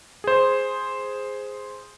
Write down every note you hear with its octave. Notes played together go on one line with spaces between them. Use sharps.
G#4 C5